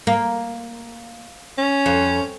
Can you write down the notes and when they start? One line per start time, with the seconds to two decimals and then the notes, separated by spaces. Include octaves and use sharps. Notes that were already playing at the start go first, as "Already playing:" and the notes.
0.07 A#3
1.58 C#4
1.86 F2